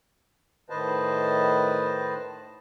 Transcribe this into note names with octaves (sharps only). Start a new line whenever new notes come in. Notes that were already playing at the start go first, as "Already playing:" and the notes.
A2 D#3 B4 C5 D#5 A5